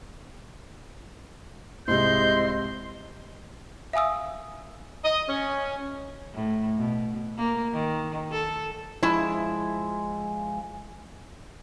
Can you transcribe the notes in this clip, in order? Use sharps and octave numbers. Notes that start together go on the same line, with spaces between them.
C2 G#2 C3 E4 C5 D#5 C6 G6
E5 F5 G#5 D#6 E6
D#5
C#4
A2
B2
A#3
D#3
A4
F3 G#3 E4 A5